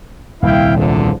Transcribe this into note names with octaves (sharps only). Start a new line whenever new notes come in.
D#1 C2 E4 F5 G5
E2 D3 F3